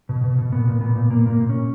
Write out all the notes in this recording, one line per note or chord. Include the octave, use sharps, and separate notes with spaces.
B2
B2
B2
A#2 B3
A#2
A#2 B3
A#2
A#2 A#3
A#2 A#3
A#2
C#4
A#2